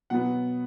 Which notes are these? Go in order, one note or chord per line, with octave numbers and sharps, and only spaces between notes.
B2 F#3 B3 F#5